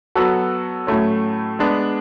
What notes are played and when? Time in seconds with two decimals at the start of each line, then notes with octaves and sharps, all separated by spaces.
0.15 F#3 B3 F#4 A4
0.87 A2 F#3 A3 C#4
1.59 G#3 B3 D4